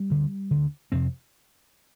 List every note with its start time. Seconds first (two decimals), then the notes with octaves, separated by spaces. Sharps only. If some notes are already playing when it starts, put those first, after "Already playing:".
Already playing: G3
0.10 D2 D3
0.51 D2 D3
0.92 F2 C3 C4